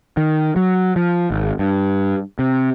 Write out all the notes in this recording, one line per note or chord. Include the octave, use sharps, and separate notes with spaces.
D#3
F#3
F3
G#1
G2
C3